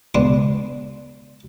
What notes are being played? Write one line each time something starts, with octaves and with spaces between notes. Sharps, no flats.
C#2 B3 D4 C6